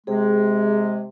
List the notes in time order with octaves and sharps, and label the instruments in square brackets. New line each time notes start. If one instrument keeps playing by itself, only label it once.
[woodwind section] C3 G#3 [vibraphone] G#4